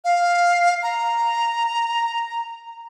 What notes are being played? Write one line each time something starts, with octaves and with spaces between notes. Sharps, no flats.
F5
A#5